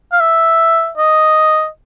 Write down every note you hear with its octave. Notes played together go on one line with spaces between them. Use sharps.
F5
E5
D#5